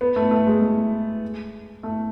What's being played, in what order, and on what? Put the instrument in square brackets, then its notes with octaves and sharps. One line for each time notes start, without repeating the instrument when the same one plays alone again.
[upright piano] B3
A3
A3
G#3
G#3
A3